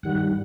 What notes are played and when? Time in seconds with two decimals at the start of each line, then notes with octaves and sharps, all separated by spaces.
0.03 G2 D#3 G3 F#5